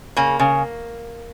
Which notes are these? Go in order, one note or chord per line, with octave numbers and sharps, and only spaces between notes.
C#3 A#3
C#3